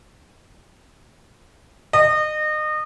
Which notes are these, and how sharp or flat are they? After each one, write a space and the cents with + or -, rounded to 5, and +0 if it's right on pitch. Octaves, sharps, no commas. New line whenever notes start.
D#5 -30